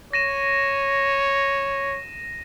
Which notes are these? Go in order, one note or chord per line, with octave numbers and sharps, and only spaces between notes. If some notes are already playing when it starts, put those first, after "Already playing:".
C#5 A#6 D#7 E7